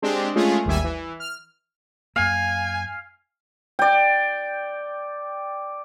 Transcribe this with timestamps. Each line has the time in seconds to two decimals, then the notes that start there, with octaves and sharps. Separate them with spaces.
0.02 G#3 C4 D4 G4
0.36 G#3 A3 C#4 F4 G#4
0.65 G#1 D#2 G3 E5 G#5
0.84 E3
1.20 F6
2.16 F#2 A#3 F5 G#5
3.79 D5 G5